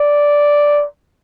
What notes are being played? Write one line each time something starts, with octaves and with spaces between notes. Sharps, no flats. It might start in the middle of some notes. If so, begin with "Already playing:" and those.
Already playing: D5